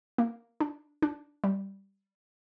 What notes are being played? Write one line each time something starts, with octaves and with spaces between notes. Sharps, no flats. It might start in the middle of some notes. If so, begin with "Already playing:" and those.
A#3
D4
D4
G3